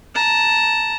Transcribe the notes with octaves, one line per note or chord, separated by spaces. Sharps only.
A5 A#5